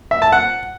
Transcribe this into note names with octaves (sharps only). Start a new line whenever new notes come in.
E5
A5
F#5